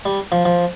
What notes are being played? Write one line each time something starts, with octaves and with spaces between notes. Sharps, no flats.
G3
F3
F3